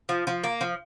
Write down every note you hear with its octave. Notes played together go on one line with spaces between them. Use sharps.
F3
F3
A#3
F3